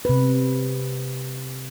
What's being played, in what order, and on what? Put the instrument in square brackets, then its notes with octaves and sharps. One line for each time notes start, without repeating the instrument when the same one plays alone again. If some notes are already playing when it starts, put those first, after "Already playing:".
[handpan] C3 B4